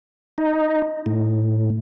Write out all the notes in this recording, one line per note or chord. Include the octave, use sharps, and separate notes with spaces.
D#4
A2